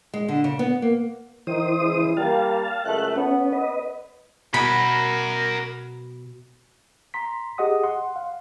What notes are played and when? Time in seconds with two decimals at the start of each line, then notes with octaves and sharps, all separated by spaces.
0.13 G#3
0.28 D3
0.44 C#3
0.59 B3
0.82 A#3
1.47 D#3 E3 C5 D#6
1.79 C#2 E4
2.17 G3 A#3 F5 A5
2.85 C#2 F#2 A3 F#6
3.16 B3 C#4
3.52 B4 D#5
4.54 B2 A#4 F#5 B5
7.14 A#5 C6 B6
7.58 G4 G#4 D#5 F#5 D#6
7.83 F#5 C6
8.16 F5